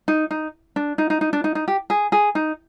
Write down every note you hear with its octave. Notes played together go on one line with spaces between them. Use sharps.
D#4
D#4
D4
D#4
D#4
D#4
D4
D#4
D#4
G4
G#4
G#4
D#4